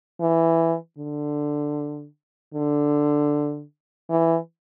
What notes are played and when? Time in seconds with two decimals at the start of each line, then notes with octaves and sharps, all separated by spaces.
0.21 E3
0.98 D3
2.54 D3
4.10 E3